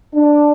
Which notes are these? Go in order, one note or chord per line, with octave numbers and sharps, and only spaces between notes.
D4